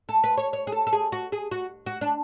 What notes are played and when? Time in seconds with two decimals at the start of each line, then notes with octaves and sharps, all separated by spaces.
0.09 A4
0.24 B4
0.38 C#5
0.53 C#5
0.67 G#4
0.72 A4
0.87 A4
0.93 G#4
1.12 F#4
1.32 G#4
1.51 F#4
1.86 F#4
2.01 D4